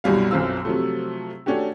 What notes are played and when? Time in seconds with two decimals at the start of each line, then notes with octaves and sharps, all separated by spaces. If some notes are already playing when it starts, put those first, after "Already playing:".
0.04 C2 F#2 B2 G3 F5
0.31 B1 F#2 C4 F4 E6
0.65 C3 F3 F#3 A3
1.46 A3 C#4 D4 F#4 G4